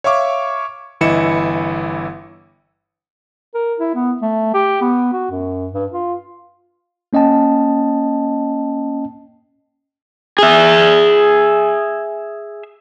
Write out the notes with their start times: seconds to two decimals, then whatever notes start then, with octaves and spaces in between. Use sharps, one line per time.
0.04 C#5 E5 F5 C#6 D6
1.01 G1 E3 E4 D#5 C#7 E7
3.55 A#4
3.80 E4
3.95 B3
4.22 A3
4.54 G4
4.81 B3
5.13 F#4
5.31 F#2
5.73 G2
5.92 F4
7.13 A#3 C#4 D#5 G5 A5
10.39 G#4 E5